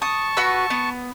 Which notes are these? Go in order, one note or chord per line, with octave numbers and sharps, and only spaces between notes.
A5 C#6 D#6
F#4 B4 E6
B3